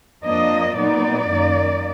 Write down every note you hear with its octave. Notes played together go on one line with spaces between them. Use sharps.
F2 F3 A#3 D4 D#5
A#2 F#3 B3 D#4 D5
F#2 D#3 A#3 D#4